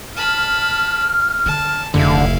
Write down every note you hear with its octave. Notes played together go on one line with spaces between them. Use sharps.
A5 B5 F6
D3 A5
F1 D2 D3 E4 F5